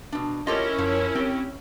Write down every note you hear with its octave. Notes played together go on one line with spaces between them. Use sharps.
B2 D4
C#4 E4 F4 G4 A4 A#4 D#5
F#2 F3
C4 G4